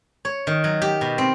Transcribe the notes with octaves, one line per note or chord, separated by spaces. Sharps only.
C#5
D#3
F#3
G4
B2
C4